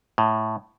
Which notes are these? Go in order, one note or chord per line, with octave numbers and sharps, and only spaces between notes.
A2